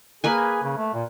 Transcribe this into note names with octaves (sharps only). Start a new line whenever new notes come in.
A#3 G#4 B4 G#5
C#3
A3
A#2